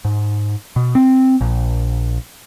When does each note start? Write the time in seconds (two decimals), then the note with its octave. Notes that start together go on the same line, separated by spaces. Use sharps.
0.05 G#2
0.76 B2
0.95 C4
1.41 A#1